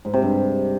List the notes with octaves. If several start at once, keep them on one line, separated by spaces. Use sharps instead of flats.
G#2
C3
G2